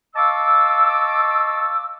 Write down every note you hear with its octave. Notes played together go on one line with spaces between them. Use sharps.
D#5 F5 A5 C#6 D6 E6